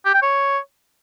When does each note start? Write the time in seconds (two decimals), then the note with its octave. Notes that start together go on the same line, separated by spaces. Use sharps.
0.05 G4
0.14 G5
0.22 C#5